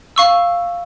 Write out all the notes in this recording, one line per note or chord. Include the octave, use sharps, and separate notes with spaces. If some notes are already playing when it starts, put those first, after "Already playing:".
F5 C#6 E6